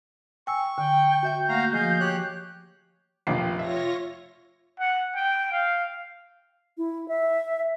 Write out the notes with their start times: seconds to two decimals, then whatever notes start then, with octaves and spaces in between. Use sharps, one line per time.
0.47 G5 G#5 C#6 E6
0.78 D3 G5
1.23 F#4 E5 G5 G6
1.49 A3 A#3 F#4 F5 A#5
1.73 F3 F#4 G#4 D#5 F5
2.00 G4 C#5 F#6
3.27 F1 A#1 G5 C7
3.59 F4 C#5 E5 A#6
4.80 F#5
5.15 G5
5.52 F5
6.77 E4
7.08 E5